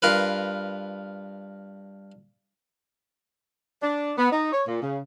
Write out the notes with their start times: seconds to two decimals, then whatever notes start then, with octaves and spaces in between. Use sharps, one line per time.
0.02 G2 F4 A#4 B4
3.82 D4
4.18 B3
4.31 D#4
4.52 C#5
4.68 A#2
4.82 C#3